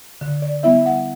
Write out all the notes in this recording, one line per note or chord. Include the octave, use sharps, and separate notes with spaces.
D3
D5
G3 B3 E4 E5
F#5